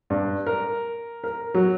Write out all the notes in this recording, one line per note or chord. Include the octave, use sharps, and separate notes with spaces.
G2
A#4
A#4
F#3